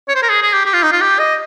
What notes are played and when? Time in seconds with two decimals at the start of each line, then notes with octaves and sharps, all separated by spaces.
0.08 C#5
0.15 C5
0.22 A#4
0.30 G#4
0.42 G#4
0.54 G4
0.66 G4
0.74 F4
0.83 D#4
0.92 F4
1.01 G4
1.19 D#5